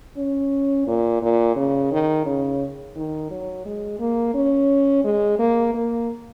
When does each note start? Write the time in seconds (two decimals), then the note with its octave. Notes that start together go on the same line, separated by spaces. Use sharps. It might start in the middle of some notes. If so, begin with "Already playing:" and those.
0.17 C#4
0.87 A#2
1.22 A#2
1.56 C#3
1.92 D#3
2.26 C#3
2.96 D#3
3.30 F#3
3.65 G#3
3.99 A#3
4.34 C#4
5.04 G#3
5.39 A#3
5.74 A#3